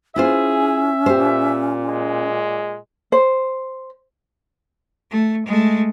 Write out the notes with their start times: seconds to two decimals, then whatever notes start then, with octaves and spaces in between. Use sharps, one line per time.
0.16 C#4 E4 F4 G#4 C5 E5
1.06 A#2 G4 C5
1.89 G#3
3.12 C5
5.11 A3
5.46 G#3 A3